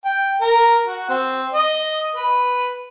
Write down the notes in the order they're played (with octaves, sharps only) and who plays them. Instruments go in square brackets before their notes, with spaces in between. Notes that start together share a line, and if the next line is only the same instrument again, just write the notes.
[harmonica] G5
A#4
F#4
C4
D#5
B4